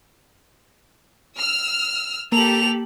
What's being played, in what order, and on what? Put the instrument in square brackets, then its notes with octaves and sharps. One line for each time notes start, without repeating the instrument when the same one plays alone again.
[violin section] E6 F6
[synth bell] A#3 F#7 [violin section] G4 A4 [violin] F7